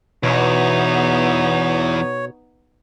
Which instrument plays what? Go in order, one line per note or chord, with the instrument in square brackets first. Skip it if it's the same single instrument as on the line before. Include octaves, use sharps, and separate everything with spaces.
[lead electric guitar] E2 [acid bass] B2 [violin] B3 D#4 [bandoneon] C#5